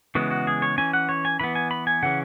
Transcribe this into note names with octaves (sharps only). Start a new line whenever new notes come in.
C#3 E3 G#3 B3 F#4
F#4
G#4
C#5
E3 C#4 G#5
F#5
C#5
G#5
E3 B3 B5
G#5
B5
G#5
C#3 E3 C#4 F#5